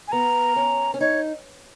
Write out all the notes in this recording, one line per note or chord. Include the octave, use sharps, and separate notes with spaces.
G#5
B3 A#5
C#4
C#4
D#4 C#5